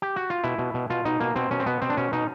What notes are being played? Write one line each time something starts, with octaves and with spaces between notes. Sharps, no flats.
G4
F#4
F4
B2 E4
B2
B2
B2 F4
B2 D#4
B2 A#3
B2 C4
B2 C#4
C4
B2 B3
B2 C4
D4
B2 C#4
B2 D#4